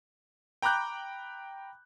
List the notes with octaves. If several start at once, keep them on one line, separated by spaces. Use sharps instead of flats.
G5 A#5 B5 D6 F#6 G6